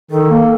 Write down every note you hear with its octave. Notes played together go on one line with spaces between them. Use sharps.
D#3 A4
A#3